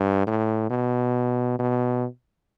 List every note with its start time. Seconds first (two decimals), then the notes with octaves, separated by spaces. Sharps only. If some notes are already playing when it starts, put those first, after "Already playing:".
Already playing: G2
0.27 A2
0.70 B2
1.59 B2